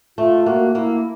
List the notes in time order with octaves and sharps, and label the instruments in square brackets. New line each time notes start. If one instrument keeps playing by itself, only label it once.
[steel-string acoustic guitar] A3 [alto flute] F4
[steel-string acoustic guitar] A#3 [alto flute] F#4
[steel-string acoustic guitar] A#3 [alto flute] E4